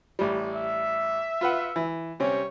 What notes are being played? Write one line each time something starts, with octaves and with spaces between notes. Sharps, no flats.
A1 G3
E5
F4 B4 F#5
E3
C3 G3 C4 C#4 C#5